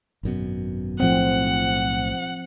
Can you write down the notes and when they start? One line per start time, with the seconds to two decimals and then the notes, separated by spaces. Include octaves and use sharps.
0.23 G#1 F#2 B2
1.00 B1 A2 F3 A3 C4 F#5